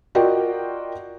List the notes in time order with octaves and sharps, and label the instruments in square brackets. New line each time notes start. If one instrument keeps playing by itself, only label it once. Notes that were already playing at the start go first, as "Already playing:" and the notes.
[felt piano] F4 F#4 A#4 D5 D#5 G5